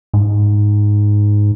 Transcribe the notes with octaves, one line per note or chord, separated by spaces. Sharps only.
G#2